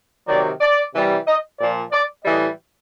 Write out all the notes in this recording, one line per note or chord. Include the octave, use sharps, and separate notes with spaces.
C3 D#3 F#3 D5
D5
C3 E3 G3
D#5
A#2 F3 D5
D5
A2 E3 G3 D#5